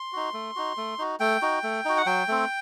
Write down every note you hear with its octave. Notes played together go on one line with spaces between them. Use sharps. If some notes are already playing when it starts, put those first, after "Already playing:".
Already playing: C6
D#4 F#4
A3
D#4 F#4
A3
D#4 F#4
A3 G5
D#4 F#4
A3
D#4 F#4
F#5
F#3 G5
A3 C4